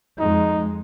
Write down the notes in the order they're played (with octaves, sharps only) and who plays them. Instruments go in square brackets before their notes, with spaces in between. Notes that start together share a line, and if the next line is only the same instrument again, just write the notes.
[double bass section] F2 G#3 [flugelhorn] D#4